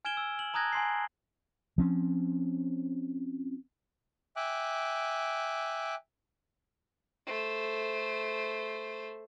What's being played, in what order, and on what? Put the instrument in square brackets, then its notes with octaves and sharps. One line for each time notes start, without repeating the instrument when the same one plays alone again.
[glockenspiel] G#5 F6 G#6 D7 E7 G7
E6
F#7
A5 A#5 D#6 F#6 G#6 A#6
G#5 C6 C7
[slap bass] F3 C4 C#4
[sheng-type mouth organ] E5 G5 G#5 D6 F#6
[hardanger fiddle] A3 C5